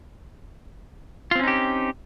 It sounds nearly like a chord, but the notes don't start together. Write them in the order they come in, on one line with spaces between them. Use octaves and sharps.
F4 C4 C#4 D#4 G4